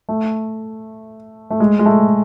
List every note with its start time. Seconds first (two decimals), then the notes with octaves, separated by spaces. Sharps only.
0.09 A3
1.50 A3
1.60 G#3
1.79 G#3
1.86 A3